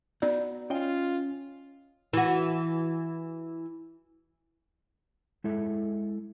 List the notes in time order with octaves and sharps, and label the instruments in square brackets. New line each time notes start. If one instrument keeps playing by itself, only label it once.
[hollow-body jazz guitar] B3 D#4 F#4 [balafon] D5
[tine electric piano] C#4 [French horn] F4 [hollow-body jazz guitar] D#5 G5
[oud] E3 F#4
[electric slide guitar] G#3 E4 A4 E5